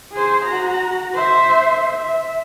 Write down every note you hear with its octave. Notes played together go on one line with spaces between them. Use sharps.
G#4 C5
F#4 A#5
C5 E5
E5